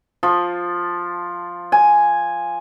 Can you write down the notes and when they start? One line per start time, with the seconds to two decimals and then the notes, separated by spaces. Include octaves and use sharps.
0.23 F3
1.72 G#5